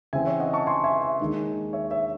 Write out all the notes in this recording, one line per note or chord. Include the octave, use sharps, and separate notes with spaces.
C#3 E3 C4 E5 G#5
C#5 E5
D#5 F#5
A5 C#6
G#5 C6
E5 G#5
E5 G#5
D#2 D#3 G#3 D#4
C#5 E5
C#5 E5